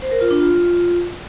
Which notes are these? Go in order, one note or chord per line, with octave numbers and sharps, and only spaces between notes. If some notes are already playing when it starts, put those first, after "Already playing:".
C5
A#4
F4
D4
F4